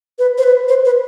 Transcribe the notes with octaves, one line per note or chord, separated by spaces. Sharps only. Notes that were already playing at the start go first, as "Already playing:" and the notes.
B4
C5
B4
C5
B4